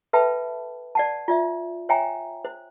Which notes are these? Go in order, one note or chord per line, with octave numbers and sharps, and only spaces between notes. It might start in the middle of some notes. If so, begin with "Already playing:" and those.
A4 B4 E5 G5 A5 B5
D5 F#5 A5
F4 D5 E5
C#5 E5 G5 G#5 A#5
C5